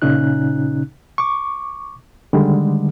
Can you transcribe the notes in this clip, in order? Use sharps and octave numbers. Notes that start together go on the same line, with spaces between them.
A#2 C#3 C#4 D#4 F#6
C#6 D6
D3 D#3 G3 G#3